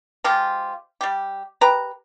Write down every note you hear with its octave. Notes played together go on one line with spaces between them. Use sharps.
F3 G#3 F4 G4
G3 G4
G4 A#4 B4 A#5